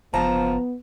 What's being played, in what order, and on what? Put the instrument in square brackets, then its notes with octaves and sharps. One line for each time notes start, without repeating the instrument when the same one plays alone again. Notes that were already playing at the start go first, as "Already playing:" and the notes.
[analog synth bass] F#1 [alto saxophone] F3 [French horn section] B3 [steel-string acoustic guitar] A5 A#5